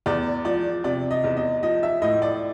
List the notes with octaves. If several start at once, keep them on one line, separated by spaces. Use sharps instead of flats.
E2 D5
F3 D5
C3 D5
D#5
E2
D#5
F3 D#5
E5
A2 D#5
D5